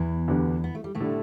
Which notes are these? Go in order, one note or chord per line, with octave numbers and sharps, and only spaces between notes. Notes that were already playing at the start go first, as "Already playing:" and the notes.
Already playing: E2 E3
D2 D3 B3 G4
B3
A3
G3
A2 A3
D3 G3 E4 A4